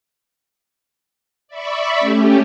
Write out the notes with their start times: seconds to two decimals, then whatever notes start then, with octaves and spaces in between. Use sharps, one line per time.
1.48 D5 E5 B5 C#6
1.99 A3 C#4 G4